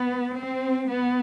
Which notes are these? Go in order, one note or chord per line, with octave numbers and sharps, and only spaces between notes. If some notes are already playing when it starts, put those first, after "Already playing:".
Already playing: B3
C4
B3